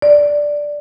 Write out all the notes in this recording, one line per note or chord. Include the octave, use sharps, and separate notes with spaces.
D5